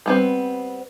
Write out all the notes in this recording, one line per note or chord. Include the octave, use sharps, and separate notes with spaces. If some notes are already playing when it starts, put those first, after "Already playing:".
G3 B3 C4